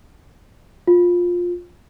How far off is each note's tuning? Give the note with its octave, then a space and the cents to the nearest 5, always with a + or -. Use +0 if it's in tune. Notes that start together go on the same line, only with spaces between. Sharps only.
F4 +15